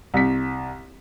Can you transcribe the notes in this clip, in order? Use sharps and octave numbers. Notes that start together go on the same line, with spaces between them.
C2 B6